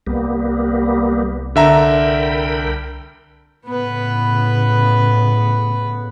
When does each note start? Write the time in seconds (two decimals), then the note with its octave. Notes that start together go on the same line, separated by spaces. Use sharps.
0.07 C2 G3 A#3 B3
1.56 D3 A#4 E5 G5 A#5 B5
3.65 A2 C#3 B3 B4